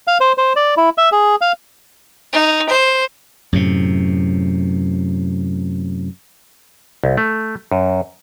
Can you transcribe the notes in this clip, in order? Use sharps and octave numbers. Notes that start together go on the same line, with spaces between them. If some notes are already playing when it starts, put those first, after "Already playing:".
F5
C5
C5
D5
E4
E5
G#4
F5
D#4
C5
F#2 A2 C3
C2
A3
F#2